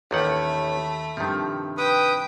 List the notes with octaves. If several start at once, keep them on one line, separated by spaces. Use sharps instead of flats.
A1 D#2 D#3 A3 F#5 B5 D6 A6
G2 C3 D#3 F3
B4 G5 D#6